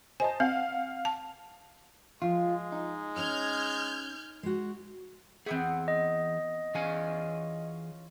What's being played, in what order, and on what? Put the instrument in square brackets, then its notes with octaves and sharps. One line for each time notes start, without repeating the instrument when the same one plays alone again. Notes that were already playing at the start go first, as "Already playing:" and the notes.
[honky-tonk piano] C5 D#5 A5 [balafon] G#5
[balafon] C4 [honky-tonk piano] F5 F#5
[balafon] A5
[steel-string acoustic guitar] F3 [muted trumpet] G#3 [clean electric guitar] F4
[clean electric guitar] D#4
[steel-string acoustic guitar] C#4 C#5 D#5 [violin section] F6 G6 G#6
[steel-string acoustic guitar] G#3 F#4
[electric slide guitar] E3 G#4 [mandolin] A3 B3 C4
[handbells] D#5
[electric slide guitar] E3 G#4 G#5 [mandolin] C#4 F4